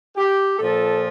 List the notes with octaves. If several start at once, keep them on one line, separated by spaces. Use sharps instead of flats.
G4
A#2 F3 A4